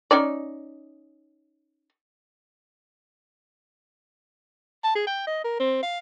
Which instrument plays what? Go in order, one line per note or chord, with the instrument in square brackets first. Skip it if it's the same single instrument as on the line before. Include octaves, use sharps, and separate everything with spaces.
[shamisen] C#4 D#4 D5
[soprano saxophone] A5
G#4
G5
D#5
A#4
C4
F5